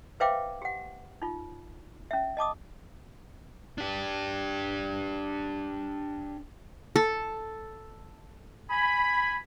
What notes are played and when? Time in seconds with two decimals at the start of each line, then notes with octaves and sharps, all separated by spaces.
0.20 B4 C5 E5 F5 G5 D6
0.62 G4 F#5
1.22 D#4 F4
2.11 C#4 E5
2.37 D#5 A5 D6 D#6
3.78 D4 G4
6.96 A4
8.70 G#5 B5